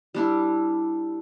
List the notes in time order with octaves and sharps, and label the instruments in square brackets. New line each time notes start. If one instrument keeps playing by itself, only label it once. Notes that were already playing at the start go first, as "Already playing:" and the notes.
[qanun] G3 D4 E4